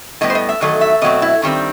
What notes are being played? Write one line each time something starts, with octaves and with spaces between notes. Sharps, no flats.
A2 G3 B3 D#5
C5
D#5
E5
E2 D#3 F#3 A3 D#5
E5
B2 F#3 A3 C4 D#5
E4
G2 D#3 G3 C4